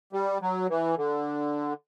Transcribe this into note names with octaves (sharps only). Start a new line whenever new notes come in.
G3
F#3
E3
D3